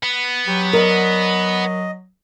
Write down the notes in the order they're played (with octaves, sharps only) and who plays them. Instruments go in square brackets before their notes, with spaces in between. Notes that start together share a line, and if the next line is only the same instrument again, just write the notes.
[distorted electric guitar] B3
[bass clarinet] F#3 [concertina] G4 B5
[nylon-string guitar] A#4 D5 [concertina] D#5